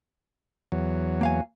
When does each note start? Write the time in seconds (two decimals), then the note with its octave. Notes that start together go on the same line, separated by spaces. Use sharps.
0.72 E2 F#3
1.21 A#3 F5 G#5